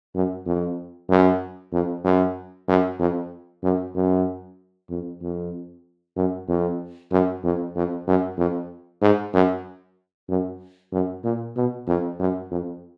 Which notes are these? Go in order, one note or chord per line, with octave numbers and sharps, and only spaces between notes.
F#2
F2
F#2
F2
F#2
F#2
F2
F#2
F#2
F2
F2
F#2
F2
F#2
F2
F2
F#2
F2
G#2
F#2
F#2
F#2
A#2
B2
F2
F#2
F2